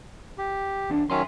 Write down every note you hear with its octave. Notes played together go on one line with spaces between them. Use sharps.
G4
D#2 D4
D#3 F#3 C#4 E5 G#5 C6